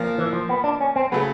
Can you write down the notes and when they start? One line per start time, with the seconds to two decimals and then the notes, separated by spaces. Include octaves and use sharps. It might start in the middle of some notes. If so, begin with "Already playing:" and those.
Already playing: A#2 F3 A#3
0.18 E3
0.33 F3
0.49 B3
0.64 D4
0.81 C#4
0.96 C4
1.12 C#3 F#3 A3 B3